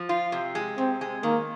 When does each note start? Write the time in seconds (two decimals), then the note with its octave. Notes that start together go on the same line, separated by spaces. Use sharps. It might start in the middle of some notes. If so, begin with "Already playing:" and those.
Already playing: F3
0.09 F4
0.32 C3
0.55 G#3
0.77 C3 C4
1.01 G#3
1.23 D#3 A#3